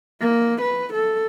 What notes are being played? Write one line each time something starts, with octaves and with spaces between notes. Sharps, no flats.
A#3
B4
A4